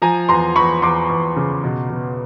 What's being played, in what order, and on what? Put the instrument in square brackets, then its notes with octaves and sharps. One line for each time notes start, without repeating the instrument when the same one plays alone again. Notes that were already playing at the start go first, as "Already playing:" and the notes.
[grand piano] F3 G#5 A#5
E2 A#5 C6
E2 B5 C#6
E2 C6 D6
E2
C#3
B2
B2